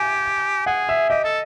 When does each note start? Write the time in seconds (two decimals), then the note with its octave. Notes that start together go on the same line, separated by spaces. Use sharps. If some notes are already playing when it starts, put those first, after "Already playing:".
Already playing: G4 G#5
0.66 G#4 F#5
0.89 E5
1.09 G4 D#5
1.24 A4